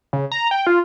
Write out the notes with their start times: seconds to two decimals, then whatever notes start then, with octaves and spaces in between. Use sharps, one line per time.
0.13 C#3
0.32 A#5
0.51 G5
0.67 F4